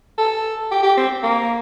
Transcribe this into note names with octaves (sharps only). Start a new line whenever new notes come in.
A4
G4
G4
C4
A#3